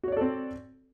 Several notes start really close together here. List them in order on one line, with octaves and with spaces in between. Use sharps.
F#4 C#5 D5 A4 C4